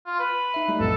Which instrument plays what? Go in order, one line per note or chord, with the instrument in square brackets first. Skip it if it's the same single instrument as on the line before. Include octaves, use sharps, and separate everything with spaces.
[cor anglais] F4
B4
[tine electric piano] D#4 E5
G3 A3 D#4
[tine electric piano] B1 F2 A2 [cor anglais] A4